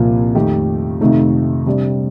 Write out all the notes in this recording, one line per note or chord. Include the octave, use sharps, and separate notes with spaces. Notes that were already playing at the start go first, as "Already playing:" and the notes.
Already playing: C2 A#2 F3 A#3 F4
F2 D#3 A3 D#4 G4
F2 C3 D#3 A3 D#4
C3 G3 D4 G4 D5